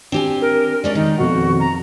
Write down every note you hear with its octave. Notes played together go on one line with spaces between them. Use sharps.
C4 D4 G4 G#5
A#4
F3 G#3 C#4 A#4 D5
D#3 D#4
F2 B2 F#4 F#5
A#5